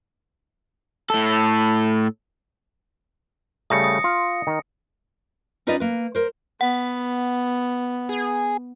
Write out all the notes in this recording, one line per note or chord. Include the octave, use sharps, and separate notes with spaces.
A2 A4
C#3 G3 A3 D#6 A#6 C#7
D#6
F4
D#3
C#4 D#4 F4 B4 D5 D#5
A#3 B4
A#4 C5
B3 F#5
G#4